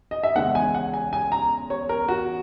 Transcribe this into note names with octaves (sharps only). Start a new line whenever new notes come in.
D#5
E5
E2 C#3 G#3 C#4 F#5
G#5
F#5
G#5
G#5
A#5
C#5
A#4
F#4